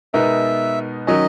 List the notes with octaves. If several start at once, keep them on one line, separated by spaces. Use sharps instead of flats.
B2 G#3 B3 D#4 A#4 E5
D#3 F#3 C#4 D#5